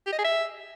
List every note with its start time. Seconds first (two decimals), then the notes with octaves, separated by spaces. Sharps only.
0.07 G4
0.12 D#5
0.18 G#4
0.24 E5